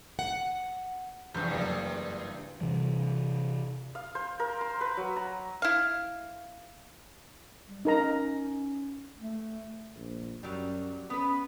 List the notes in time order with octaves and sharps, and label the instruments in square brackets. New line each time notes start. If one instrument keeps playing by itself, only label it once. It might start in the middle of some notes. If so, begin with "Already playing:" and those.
[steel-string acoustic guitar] F#5
[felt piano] F1 G6 [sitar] E2 G2
[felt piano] F#1
[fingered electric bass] C3 E3 G3
[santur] F5
C5
A#4
C6
B4
F#3
A#5
[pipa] E4 F5
[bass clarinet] G3
[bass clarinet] C#4 [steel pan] D#4 A#4 A#5
[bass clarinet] A3
[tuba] A#1
[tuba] F#2 [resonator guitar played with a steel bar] F#3 G3
[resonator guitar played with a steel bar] B3 B4 [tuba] C#4